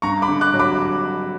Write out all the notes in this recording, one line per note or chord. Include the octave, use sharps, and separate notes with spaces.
G2 A#5 C#6
B5 D6
D3
D6 F#6
F#3
B5 D6